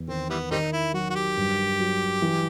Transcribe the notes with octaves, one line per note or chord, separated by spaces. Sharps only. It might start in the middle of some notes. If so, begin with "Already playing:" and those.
Already playing: E2
D#3 C4
E3 G3 B3
D#3 G3 C4 D#4
E4
F#3 F#4
F#4
G4
G2
F#3
E3